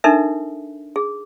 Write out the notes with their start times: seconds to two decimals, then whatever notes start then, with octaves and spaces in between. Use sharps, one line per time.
0.04 D4 D#4 A4 A#4 E5
0.96 G#4